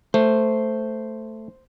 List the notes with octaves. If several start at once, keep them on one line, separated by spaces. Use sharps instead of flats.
A3 C5